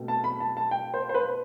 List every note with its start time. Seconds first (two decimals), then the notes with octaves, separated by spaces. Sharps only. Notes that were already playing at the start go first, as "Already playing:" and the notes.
Already playing: B2 A3 C4
0.08 A5
0.24 B5
0.40 A5
0.57 A5
0.71 G5
0.94 C5
1.09 C5
1.14 B4